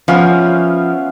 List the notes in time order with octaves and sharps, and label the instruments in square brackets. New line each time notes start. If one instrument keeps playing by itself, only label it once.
[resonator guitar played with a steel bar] F3 [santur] B3 E5 F5 [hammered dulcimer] C#4